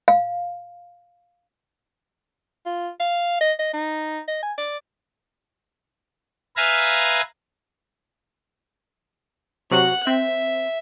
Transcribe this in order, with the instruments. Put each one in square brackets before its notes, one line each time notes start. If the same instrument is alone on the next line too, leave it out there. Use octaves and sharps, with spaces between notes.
[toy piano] F5
[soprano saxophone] F4
F5
D#5
D#5
D#4
D#5
G#5
D5
[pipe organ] B4 E5 F5 G#5 A#5
[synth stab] C3 F#3 F#4 [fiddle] F#5 F#6
[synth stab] C4 [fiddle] E5